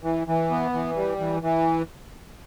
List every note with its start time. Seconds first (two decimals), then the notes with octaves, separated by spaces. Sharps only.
0.04 E3
0.27 E3
0.51 B3
0.73 E3
0.96 G3
1.19 E3
1.42 E3